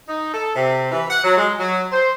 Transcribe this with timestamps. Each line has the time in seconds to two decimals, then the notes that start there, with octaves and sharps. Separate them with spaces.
0.08 D#4
0.34 A4
0.56 C3
0.92 E3
1.09 F#5
1.24 F#3
1.38 G#3
1.59 F#3
1.92 C5